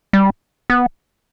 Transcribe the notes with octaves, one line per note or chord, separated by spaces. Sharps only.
G3
B3